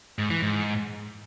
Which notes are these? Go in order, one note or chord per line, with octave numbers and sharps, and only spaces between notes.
G#2
E3
G#2